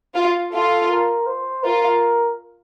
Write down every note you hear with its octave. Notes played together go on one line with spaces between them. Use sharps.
F4
F4 A4
A#4
C5
F4 A#4